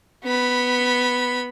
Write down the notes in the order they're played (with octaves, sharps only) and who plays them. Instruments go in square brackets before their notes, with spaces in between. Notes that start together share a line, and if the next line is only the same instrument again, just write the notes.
[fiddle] B3 B5